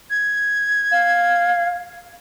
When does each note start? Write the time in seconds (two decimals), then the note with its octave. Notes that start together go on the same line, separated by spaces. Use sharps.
0.10 G#6
0.92 F5